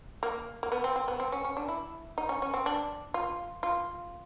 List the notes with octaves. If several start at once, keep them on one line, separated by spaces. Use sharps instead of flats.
A#3
A#3
B3
C4
C4
B3
C4
C#4
C#4
D4
E4
D#4
C#4
C#4
C4
D4
F4
F4